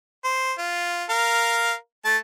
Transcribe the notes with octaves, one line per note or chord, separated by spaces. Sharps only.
C5
F4
A#4 F5
A3 A5